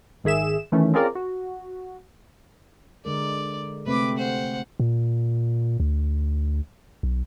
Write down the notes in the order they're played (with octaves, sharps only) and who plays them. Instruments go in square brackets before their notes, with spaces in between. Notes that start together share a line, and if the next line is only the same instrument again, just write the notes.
[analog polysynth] G#1 D#3 G#4 E5 E7
D#3 E3 A3 C#4
C4 C#4 F4 G#4 A#4 D5
F#4
[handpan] D3 G#3 A#4 [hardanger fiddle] D5
[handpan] C3 A3 C4 [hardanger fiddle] B4 D6
[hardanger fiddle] C5 F#5
[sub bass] A#2
D2
B1